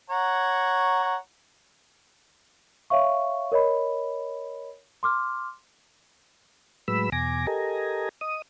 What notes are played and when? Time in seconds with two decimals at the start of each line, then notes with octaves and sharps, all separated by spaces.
0.10 C#5 F#5 A#5
2.90 C#5 E5 F5 C#6
3.52 A#4 C#5 D#5 B5
5.03 C6 D6 F6
6.88 A2 F#3 G#3 B4 B5 E6
7.12 E2 B2 G#5 D6 A#6
7.47 G4 A4 A#4 D#5 G#5 A#5
8.21 D#5 D#6